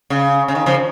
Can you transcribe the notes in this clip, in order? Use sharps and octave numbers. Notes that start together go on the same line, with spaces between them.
C#3
C#3
D#3
C#3 F3